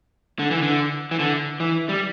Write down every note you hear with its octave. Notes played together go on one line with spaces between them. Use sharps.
D3
E3
D3
E3
D3
E3
G3